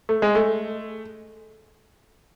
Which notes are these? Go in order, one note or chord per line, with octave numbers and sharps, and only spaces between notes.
A3
G#3
A3